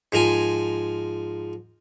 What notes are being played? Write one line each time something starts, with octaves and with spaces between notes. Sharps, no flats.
G#2 F3 A#4 G#5